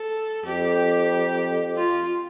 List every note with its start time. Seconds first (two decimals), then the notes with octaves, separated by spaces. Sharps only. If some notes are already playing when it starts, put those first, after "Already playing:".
Already playing: A4
0.45 F2 G4
1.76 F4